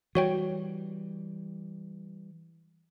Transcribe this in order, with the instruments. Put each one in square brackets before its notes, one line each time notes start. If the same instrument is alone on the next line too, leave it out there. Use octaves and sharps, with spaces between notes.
[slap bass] E3 G3 [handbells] F#4 C#5 G5